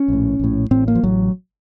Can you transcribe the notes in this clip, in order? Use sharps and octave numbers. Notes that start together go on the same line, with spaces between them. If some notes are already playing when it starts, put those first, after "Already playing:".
Already playing: C#4
A#1 A2
A#1 A2
A1 A2 C4
A#3
F3
A1 A2 F#3